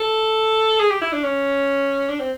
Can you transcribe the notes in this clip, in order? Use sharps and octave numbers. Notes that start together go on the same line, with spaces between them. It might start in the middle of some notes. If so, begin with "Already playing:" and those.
Already playing: A4
G#4
G4
E4
D4
C#4
D4
C4